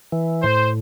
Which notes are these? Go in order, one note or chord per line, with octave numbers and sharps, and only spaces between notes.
E3
A2 C5